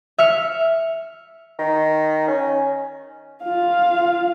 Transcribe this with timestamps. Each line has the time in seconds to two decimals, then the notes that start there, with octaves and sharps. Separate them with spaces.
0.18 E5 F6 C#7
1.59 D#3
2.28 C#4
3.43 F4 F5